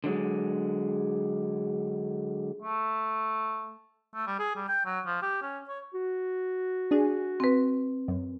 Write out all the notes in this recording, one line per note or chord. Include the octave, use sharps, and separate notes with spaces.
D3 F#3 G#3
A3
A3
G3
G#4
G3
G5
F#3
F3
G4
C#4
C#5
F#4
D4 G#4
C4 B4
F#2